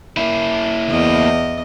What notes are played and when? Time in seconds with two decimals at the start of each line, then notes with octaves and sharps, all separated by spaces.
0.17 A#3 E4
0.89 E2 D#5